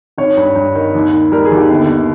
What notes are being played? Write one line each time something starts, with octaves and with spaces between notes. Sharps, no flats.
G#1 C#5
G2
G2
D#3
D#2
D#3
G3 A#4
G#4
D#2
G4
G1
G1